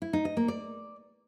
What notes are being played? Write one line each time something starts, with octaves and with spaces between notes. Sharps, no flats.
E4
D#4
D#5
A#3
D5